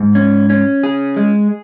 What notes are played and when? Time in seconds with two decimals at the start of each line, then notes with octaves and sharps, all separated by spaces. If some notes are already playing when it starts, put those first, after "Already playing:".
Already playing: G#2
0.15 C#4
0.50 C#4
0.83 G#4
1.16 G#3